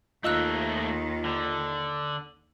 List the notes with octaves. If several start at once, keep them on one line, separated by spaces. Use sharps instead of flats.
D#2 D#3 A3 D#4 F4 D#5 E6 F#6
D3